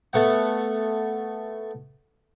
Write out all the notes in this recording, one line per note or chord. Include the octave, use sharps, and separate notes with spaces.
A3 B3 F#5